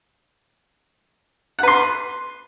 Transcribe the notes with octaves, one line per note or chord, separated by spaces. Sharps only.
B4 F#5 C6